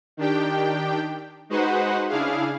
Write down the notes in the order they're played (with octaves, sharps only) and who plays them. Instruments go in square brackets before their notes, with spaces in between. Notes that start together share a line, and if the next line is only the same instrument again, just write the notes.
[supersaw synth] D#3 D4 G4 G5
G#3 D#4 F#4 B4 C5 F#5
C#3 D4 E4 G#4 F5